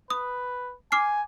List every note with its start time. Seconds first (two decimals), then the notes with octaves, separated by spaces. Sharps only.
0.10 B4 D#6
0.92 G#5 D6 F6 C7